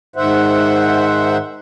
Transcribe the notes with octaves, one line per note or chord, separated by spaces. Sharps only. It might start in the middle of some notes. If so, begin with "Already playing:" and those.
G#2 D#3 C5 E5 F#5